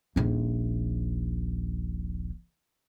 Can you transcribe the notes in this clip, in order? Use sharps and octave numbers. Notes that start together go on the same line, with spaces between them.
D#1 A#1